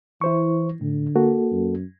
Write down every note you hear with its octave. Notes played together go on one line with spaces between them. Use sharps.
E3 E4 C5 C#6
A2 D3
A#3 F#4 A4
F#2